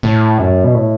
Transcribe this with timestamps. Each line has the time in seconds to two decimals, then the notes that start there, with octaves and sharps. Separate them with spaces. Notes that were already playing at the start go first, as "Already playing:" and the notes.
0.03 A2
0.38 F#2
0.64 B2
0.74 A2